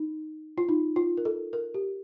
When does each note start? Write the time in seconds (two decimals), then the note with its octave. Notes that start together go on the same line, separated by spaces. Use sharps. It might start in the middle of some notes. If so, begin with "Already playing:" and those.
Already playing: D#4
0.58 F4
0.69 D#4
0.96 F4
1.17 A#4
1.25 A4
1.53 A#4
1.74 G4